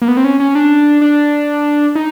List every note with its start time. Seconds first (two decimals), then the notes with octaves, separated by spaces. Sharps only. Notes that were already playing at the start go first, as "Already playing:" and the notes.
0.02 A#3
0.08 B3
0.17 C4
0.24 C#4
0.40 C#4
0.55 D4
1.01 D4
1.95 D#4